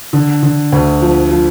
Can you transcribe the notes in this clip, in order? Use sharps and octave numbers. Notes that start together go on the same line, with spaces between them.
D3
D3
D2
F3
F3